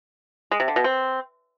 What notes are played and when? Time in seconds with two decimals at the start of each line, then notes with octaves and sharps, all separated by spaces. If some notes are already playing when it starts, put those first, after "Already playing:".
0.51 G#3
0.60 C3
0.68 D3
0.76 B2
0.84 C4